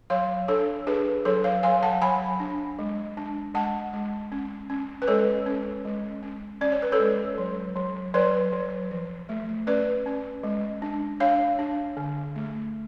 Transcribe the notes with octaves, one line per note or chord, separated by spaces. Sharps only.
F#3 C#5 F5
D4 A4 C#5
D4 G#4 B4
F#3 A4 C#5
C#5 F5
F#3 F5 G#5
F#5 A5
F#3 G#5 B5
D4
G#3
D4
G#3 F#5 A5
G#3
C#4
C#4
B4
G#3 A4 C#5
C#4
G#3
C#4
C#4 D5
C#5
B4
A4 C#5
G#3
F#3
F#3
F#3 B4 D5
F#3
F3
A3
C#4 B4 D5
C#4
G#3
D4
D4 C#5 F5
D4
D3
A3